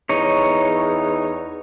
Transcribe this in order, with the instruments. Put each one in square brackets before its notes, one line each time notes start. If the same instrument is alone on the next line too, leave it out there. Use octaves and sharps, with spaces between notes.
[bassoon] E2 [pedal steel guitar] D#4 C#5